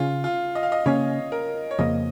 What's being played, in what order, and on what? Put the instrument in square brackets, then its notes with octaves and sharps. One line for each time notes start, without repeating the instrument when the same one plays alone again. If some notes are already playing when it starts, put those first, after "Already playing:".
Already playing: [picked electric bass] C#3 C#4 [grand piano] F4
[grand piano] F4
D#5
F5
D#5
[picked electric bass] C#3 A#3 C#4 [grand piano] C#5
[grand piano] A#4
C#5
[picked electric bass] F2 C#3 F3 A#3 [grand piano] D#5